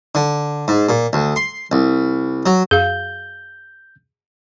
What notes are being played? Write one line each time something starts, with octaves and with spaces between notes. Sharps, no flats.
D3
G#2
A#2
D2
C6
C2
F#3
F#2 G#4 F5 G6